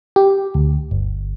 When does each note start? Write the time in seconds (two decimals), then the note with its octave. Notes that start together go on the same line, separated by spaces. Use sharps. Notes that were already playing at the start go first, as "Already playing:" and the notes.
0.16 G4
0.54 D2
0.91 G1